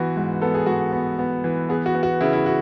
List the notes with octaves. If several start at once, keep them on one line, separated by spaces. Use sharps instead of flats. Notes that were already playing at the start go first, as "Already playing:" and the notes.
Already playing: E3 B3 F#4
G#2
B3 A4
G#4
G#2 F#4
B3
B3
E3
B3 G#4
F#4
B3
F#4
C#3 E4
E4
F#4